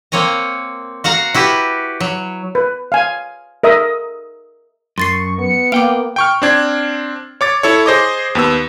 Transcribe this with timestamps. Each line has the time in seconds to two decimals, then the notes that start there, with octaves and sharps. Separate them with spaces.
0.12 A#3 C4 C#5 G#5 A#5
1.04 F#4 F5 F#5 A#5
1.34 E4 F#4 G4 B4
2.00 F#3
2.55 B4
2.92 F5 G#5
3.63 A#4 D#5 E5 D#6
4.98 F#2 C6 C#6 A6 C7
5.39 B3 C#7
5.72 A#3 F5 G5 D6 D7
6.16 G5 C#6 F6
6.42 C4 D4 G#6
7.41 C#5 D6 A6
7.63 E4 A4 C#5
7.86 G#4 C5 D#5 D6
8.35 D#2 B3 E6